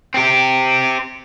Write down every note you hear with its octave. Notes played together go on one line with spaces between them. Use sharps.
C4 G4